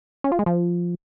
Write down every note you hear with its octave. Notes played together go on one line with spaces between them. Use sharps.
C#4
F4
G#3
F3